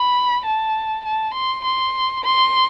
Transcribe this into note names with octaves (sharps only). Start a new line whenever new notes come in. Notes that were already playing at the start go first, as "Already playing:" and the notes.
Already playing: B5
A5
A5
C6
C6
C6